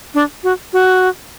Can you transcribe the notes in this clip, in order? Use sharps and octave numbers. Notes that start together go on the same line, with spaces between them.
D4
F#4
F#4